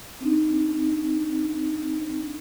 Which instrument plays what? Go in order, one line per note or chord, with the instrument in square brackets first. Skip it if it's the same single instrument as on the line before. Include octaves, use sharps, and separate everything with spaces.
[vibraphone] C4 D4 D#4